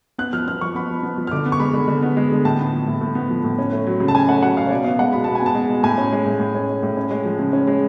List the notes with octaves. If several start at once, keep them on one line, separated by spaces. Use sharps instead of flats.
B3 F#6
F3 F6
B3 F6
F3 C#6
B3 B5
F3
B3
F3
F6
D3 D6
B3
C#6
G#3 B5
D3
D3
B3
G#3
D3
A2 A5
B3
F3
A2
A2
B3
F3
A2
C#4
A3
F#3
C#3
A5
C#4 G#5
A3 F#5
F#3 F#5
C#3 F5
C#5
B2 D5
B3 F5
G#3 F#5
B2 B5
B2 A5
G#5
B3 A5
G#3
B2
A2 G#5
C#4
G#3
A2
A2
C#4
G#3
A2
C#4
G#3
F3
C#3
C#4
G#3